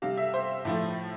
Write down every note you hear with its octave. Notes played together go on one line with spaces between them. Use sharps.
C3 G3 F5
E5
C5
A2 F3 A3